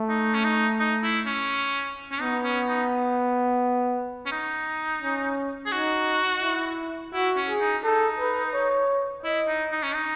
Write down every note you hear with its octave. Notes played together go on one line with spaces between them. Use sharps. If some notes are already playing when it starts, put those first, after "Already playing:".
Already playing: A3
D#4
C#4
D#4
D#4
E4
C#4
C#4
B3 D#4
C#4
D#4
C#4
D#4
C#4
G#4
D#4 F#4
E4
E4 F#4
C#4
G#4
D#4
D#4 A4
B4
C#5
E4 D#5
D#4
D#4
C#4
D#4